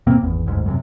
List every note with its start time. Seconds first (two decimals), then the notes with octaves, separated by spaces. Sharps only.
0.07 D#2 B2 A#3 C4
0.22 G#1 E2
0.46 F#1 D2 G#2
0.66 F#2 A2 C3